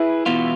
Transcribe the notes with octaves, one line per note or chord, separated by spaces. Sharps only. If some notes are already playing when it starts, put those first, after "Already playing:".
Already playing: E4 G#4 B4
E2 B2 B3 F4